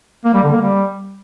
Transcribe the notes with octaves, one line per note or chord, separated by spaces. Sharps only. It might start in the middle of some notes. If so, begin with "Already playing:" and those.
A#3
G3
D3
A#3
G3